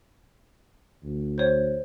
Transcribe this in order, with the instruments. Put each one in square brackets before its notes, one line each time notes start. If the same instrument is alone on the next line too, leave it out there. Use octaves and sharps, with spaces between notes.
[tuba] D2
[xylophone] C5 C#5